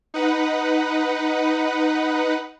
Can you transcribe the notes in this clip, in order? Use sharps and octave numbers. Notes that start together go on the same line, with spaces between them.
D#4 B4 F#5